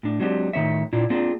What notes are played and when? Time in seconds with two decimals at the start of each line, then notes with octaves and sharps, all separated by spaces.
0.03 A2 D4
0.20 F#3 G#3 C4 D4 F4 G4
0.53 A2 D#3 B3 C#5 E5
0.93 A#2 D4 E4 F4
1.10 A#3 C4 D4 F4 G#4 D5